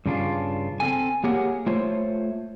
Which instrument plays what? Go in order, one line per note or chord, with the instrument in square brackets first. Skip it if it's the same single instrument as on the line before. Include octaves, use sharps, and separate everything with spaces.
[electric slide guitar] G2 C#3 D4 F4
C4 A4 G#5
A#3 G4 G#4 A#4 C#5 F#5
A3 F4 C5 C#5